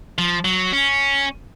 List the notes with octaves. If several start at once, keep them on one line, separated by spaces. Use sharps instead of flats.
F3
F#3
C#4